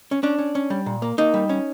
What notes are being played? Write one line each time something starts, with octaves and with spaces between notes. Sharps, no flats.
C#4
C#4 D4
C#4
C#4
G3
A#2
A#3
A#3 D#4
G3
C#4